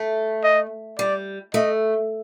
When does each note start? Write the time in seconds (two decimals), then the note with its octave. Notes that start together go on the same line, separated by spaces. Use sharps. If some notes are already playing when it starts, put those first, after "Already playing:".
Already playing: A3
0.44 D#5
0.99 G3 D5
1.54 A3 D#5